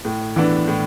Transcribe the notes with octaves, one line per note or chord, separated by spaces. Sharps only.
A2
E3 B3 D4
A2